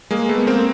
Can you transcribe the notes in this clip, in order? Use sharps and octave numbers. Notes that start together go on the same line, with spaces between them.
G#3 A#3
A3 B3
A#3 C4